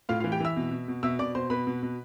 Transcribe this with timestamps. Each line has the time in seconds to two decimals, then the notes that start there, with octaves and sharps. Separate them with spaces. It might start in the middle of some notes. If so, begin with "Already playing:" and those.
0.09 A2 F4 F5
0.20 F4 F5
0.24 E3
0.32 G4 G5
0.40 E3 E5 E6
0.56 B2
0.71 B2
0.88 B2
1.03 B2 E5 E6
1.19 B2 D5 D6
1.35 B2 C5 C6
1.50 B2 B4 B5
1.67 B2
1.82 B2